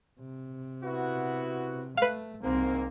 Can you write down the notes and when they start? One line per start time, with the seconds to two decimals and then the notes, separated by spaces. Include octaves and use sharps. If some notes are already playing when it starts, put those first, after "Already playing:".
0.20 C3
0.83 B3 E4 F#4
1.97 A3 B4 F5
2.43 C2 G#2 D#3 A#3 C4